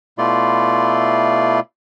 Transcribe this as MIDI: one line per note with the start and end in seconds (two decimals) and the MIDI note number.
0.18 1.60 47
0.18 1.60 57
0.18 1.60 64
0.18 1.60 65
0.18 1.60 74
0.18 1.60 84